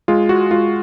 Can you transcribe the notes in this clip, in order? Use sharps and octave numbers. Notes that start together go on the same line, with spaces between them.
G#3 F4
F#4
G#3 F4